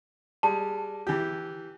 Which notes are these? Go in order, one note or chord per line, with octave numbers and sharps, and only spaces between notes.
G3 G#3 A5
E3 G4